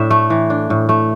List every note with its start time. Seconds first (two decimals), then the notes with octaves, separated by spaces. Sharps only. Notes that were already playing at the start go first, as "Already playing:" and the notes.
Already playing: A2 D4 E5
0.10 A3
0.30 E3
0.50 D4
0.70 A2
0.89 A3